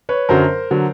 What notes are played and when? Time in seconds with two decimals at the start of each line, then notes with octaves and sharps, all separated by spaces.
0.09 B4 C#5
0.29 F#2 D3 F#3 A#4 C5
0.71 D3 F#3